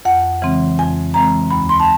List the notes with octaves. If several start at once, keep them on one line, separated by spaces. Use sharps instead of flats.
F2 F#5
C#3 E3 G#3 C4
F2 G#5
C#3 E3 G#3 C4 A#5
D#2 B5
C6
A5